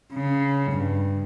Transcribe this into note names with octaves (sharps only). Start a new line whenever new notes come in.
C#3
G2